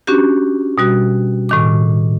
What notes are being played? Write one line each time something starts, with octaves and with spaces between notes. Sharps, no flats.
C#4 D4 F#4 G4
B2 G3 F#4
A2 D#3 D6